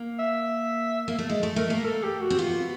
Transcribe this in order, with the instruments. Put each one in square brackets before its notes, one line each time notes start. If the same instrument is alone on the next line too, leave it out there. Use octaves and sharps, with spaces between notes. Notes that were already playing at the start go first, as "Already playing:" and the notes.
Already playing: [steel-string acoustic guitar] A#3
[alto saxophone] E5
[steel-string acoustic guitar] A#3
A3
G#3
A3
[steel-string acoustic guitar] A3 [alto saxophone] A#4
[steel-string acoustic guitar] A#3
[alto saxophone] A4
G4
F#4
[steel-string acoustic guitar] C4
[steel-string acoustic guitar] B3 [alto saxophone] F4